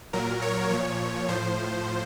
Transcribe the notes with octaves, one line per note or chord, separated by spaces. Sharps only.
A#2 F#3 A#4
C#5
A#2 F3 C#5
A2 F3 C5